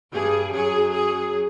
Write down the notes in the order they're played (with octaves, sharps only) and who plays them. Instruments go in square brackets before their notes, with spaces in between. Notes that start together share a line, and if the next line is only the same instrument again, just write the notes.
[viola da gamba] G2 G3 [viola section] G#4
[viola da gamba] F#2 F#3 [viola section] G#4
[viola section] G#4